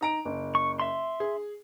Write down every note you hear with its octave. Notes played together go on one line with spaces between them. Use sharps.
D#4 A#5 D7
F#1
C#6
E5 C6
G#4